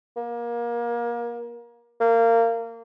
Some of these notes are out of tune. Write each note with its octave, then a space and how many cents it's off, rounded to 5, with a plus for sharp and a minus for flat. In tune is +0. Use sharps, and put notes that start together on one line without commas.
A#3 +25
A#3 -25